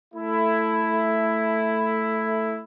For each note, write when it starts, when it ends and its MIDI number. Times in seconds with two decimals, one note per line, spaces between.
0.14 2.61 57
0.14 2.61 64